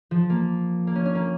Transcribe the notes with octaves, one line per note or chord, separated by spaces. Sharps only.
F3
A#3
A#3
C#4
C#4
A#3